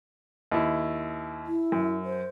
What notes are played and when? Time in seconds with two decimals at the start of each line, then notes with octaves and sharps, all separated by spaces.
0.52 D#2 E4
1.46 E4
1.72 F#2
2.05 C5